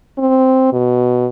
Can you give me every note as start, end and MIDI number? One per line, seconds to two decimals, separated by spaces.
0.18 0.72 60
0.73 1.26 47